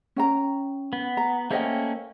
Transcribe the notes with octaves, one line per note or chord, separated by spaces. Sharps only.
C#4 G5 A#5
B3
A#5
A3 A#3 C#4 C5 D#5 G5